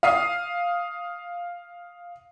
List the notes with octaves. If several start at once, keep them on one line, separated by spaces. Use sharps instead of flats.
F5 D#6 C7